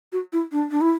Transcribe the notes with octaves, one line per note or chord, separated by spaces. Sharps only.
F#4
E4
D4
D4
E4